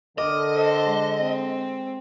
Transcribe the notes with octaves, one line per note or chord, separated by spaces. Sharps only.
D3 A#4 D#5 D6
A4 C5
G#3
C4